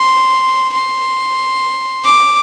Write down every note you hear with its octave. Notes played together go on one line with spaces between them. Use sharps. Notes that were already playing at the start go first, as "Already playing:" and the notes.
Already playing: C6
C6
D6